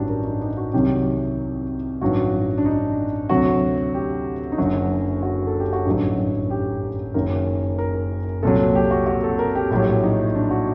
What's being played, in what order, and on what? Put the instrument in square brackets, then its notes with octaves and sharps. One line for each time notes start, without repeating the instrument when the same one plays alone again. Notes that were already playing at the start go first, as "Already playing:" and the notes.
Already playing: [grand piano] A1 G2 D#3 F#3 D4 F#4 G4
A#4
D#4
D#4
F#4
C2 C3 D#3 F#3 G4
A1 G2 D#3 F#3 F#4
D4
D#4
D2 C3 F#3 F#4
G4
D#4
F#1 F#2 D3 F#3 F#4
F#4
A4
G4
F#4
A1 G2 D3 F#3 D#4
G4
F#1 F#2 D#3 F#3 A#4
A#4
C2 A#2 F#3 A4
G4
F#4
F#4
A4
A#4
G4
A#1 A2 F#3 G4
D#4
D4
F#4